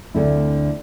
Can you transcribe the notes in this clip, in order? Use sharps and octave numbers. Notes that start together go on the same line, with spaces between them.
D2 D3 A3 C4 E4